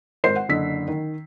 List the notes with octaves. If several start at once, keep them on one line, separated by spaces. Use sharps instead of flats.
G#1 A#4 C5 C7
F#5
F#1 D3 D#5 E6 B6
D#3